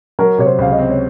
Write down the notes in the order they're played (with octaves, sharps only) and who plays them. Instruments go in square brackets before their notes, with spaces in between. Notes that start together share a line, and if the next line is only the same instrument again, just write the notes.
[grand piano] F#3 [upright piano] A#4
[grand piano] C3 [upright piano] C#5
[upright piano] C5
[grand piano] C#2 [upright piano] F5
[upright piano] D#5
[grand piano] C4
[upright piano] C#5